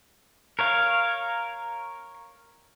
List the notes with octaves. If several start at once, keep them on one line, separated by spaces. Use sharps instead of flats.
A#4 C#5 F5